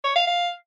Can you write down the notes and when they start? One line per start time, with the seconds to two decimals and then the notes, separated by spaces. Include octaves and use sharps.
0.04 C#5
0.16 F5
0.27 F5